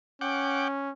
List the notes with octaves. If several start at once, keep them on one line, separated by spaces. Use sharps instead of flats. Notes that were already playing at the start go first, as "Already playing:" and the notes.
C#4 F#5 G5 D6